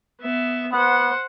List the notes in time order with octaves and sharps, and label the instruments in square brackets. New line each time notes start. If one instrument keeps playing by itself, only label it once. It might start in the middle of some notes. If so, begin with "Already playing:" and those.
[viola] B3 E5
[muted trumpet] B3 [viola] C5 F#5